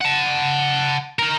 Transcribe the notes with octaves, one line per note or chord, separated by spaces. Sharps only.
F#5 A5
D#4 A#4